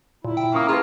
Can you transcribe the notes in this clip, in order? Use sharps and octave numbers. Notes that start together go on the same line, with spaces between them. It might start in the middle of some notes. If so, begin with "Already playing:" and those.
A#2 E4
G5
A#3 C#4 C#6 D#6
F4 G#4 B4 A5